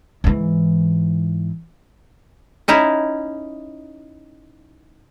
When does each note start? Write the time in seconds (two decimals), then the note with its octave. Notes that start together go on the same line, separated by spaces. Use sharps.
0.24 G#2 E3
2.68 C#4 D#4 E4